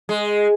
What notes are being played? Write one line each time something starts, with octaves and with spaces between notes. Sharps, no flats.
G#3